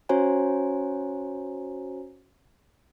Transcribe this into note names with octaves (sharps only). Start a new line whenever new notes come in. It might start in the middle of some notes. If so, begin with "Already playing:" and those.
C#4 F#4 C5 C#5 G#5 A#5